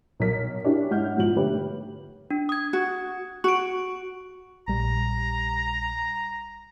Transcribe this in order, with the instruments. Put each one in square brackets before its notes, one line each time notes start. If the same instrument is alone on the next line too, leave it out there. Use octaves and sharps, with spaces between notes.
[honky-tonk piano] B1 A#4 B6
C#4 D4 E4 F#4 G4 C#5
G#2 D#4 E4 F#5 F6 G6
G#2 B2 F3 F#7
D3 A3 G4 B4 C#5
[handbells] D4
D#6 G#6
[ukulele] F#4
[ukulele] F#4 [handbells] C#6 D7
[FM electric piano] A#1 G3 [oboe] A#5